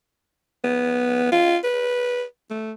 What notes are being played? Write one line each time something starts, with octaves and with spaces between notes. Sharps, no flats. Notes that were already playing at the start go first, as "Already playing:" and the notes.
B3
F4
B4
A3